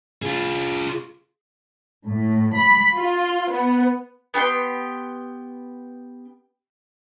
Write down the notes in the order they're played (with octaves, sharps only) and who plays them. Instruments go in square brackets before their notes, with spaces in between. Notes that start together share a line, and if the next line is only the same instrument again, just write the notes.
[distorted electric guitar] F4 G#4
[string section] A2
B5
F4
B3
[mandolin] B3 G4 G5 C6